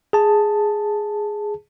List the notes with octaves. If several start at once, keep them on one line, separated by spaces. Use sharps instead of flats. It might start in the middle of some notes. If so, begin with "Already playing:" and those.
G#4 A5